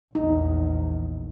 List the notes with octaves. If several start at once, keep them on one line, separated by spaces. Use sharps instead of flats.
A#1 E2 D#4